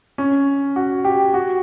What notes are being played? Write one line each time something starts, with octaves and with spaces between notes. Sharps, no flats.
C#4
F#4
G4
F#4